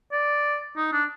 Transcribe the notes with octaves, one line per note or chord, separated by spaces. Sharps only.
D5
D#4
D4